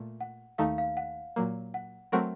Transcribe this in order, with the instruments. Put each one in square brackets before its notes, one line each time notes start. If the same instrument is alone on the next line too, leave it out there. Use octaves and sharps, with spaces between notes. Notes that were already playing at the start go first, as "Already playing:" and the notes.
Already playing: [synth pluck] A#2 A3
[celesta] F#5
[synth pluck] D#2 D#3 A3 D#4 [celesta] F5
[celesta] F5
F#5
[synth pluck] A#2 F#3 A#3
[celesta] F#5
[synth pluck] F#3 A3 C4 F#4 A#4 [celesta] F#5